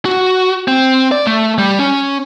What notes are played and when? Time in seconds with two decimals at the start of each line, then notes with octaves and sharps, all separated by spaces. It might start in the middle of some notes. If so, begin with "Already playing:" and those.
0.05 F#4
0.68 C4
1.12 D5
1.27 A3
1.58 G3
1.79 C#4